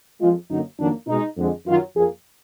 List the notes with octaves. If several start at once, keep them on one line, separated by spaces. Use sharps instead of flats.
F2 F3 G#3 F4
F#2 D3 F#3 A#3 D#4
F2 D#3 F#3 A#3 D4
B2 G#3 D#4
F2 D3 G#3
F#2 D#3 F#3 F4
F2 F3 A#3 G#4